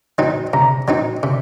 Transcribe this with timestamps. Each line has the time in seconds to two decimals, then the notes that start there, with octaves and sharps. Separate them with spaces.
0.18 F#3 C4 D#4
0.53 C3 A#5
0.88 F#3 C4 D#4
1.23 C3